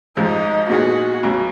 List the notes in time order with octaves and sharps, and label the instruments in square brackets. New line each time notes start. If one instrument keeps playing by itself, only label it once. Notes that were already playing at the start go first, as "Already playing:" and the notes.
[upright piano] G#1 G#2 F3 G#3 [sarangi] D#4
[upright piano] A#2 G#3 B3 D#4 G#4 [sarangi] F#4
[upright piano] B1 B2 F#3